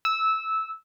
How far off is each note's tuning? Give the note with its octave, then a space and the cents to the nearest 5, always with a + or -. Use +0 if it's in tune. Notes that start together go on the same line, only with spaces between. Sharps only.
E6 -15